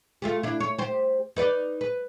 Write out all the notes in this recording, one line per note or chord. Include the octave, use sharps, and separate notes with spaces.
A3 F4 G4
D4 E4
C#5
G4 C5
D#4 B4 D5
B4